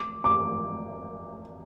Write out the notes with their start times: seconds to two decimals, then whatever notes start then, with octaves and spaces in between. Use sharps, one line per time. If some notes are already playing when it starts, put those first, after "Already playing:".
Already playing: D6
0.24 D6